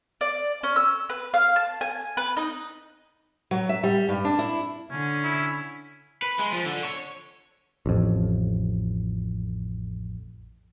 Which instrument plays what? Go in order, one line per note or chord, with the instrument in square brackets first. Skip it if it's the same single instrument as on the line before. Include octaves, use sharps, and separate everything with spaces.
[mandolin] D5
C#4
E6
B4
F5
A5
G#5
B4
D#4
[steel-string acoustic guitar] F#3
E5
G3
G2
D4
E4
[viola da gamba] D3 [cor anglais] C#4
[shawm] E4
[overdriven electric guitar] B4
G#3
F3
D3
C#5
[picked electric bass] A1 F2